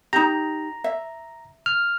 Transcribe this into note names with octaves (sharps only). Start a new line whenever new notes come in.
D#4 G4 A#5
E5
F6